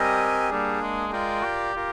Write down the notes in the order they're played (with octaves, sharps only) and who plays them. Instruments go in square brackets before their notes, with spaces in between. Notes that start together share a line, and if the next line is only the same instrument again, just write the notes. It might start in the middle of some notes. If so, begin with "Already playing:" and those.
Already playing: [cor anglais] G3 [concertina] C4 G4 A#4 D#5 G#5
[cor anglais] G3 [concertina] A#3 D4 G#4
[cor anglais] G#3
[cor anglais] G#3 [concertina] F4 A#4 D5 G5
[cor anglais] G4
[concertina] F4 A#4